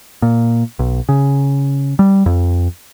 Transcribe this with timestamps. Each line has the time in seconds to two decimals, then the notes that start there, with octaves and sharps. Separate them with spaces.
0.22 A#2
0.79 B1
1.09 C#3
1.99 G3
2.26 F2